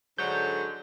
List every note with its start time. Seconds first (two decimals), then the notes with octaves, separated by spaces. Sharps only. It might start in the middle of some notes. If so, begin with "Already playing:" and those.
0.18 G#2 D3 F#3 G6